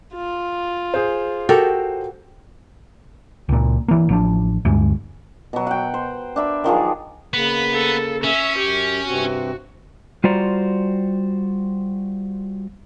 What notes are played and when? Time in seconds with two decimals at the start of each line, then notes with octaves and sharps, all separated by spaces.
0.14 F4
0.94 G#4 C5
1.49 F#4 G4 A4 A#4
3.49 C#2 A#2
3.88 E3 A#3
4.09 A1 F3 D4
4.65 D2 G2 G#3
5.53 B2 F#3
5.67 F#5 G5
5.94 C5
6.36 D4 E5 B5
6.64 D#3 F3 F#3 G#4
7.34 C#3 A#3 B3
7.74 A4
8.24 C#4 E5
8.58 F#2 G4
9.07 G2 C3 C4 F#4
10.24 G3 F4 F#4 C5 D5 A#5